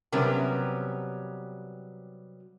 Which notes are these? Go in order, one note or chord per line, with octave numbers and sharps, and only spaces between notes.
C3 F#3 G3 B3 C#4 A#4